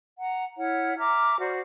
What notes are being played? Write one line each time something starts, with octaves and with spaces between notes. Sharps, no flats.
F#5 A#5
E4 C#5 F#5 F6
E5 A#5 D6 F6
F#4 C5 D5